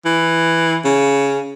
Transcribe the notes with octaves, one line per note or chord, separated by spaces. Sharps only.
E3
C#3